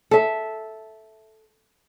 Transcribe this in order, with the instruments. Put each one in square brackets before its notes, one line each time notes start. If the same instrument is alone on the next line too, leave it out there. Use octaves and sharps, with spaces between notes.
[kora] A4 E5